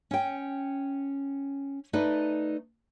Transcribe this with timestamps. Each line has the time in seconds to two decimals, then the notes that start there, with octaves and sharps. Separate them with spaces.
0.11 C#4 G5
1.93 A3 D#4 B4 D5